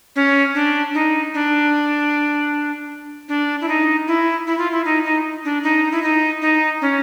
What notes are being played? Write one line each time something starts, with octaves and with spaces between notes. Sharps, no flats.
C#4
D4
D#4
D4
D4
E4
D#4
E4
E4
F4
E4
D#4
D#4
D4
D#4
E4
D#4
D#4
C#4